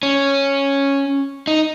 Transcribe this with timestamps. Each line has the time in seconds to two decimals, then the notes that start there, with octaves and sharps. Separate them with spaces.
0.03 C#4
1.47 D#4